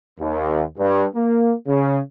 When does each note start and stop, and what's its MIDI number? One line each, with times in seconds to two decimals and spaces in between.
0.20 0.64 39
0.78 1.05 43
1.15 1.53 58
1.68 1.99 49